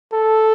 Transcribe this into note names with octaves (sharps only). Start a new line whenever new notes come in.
A4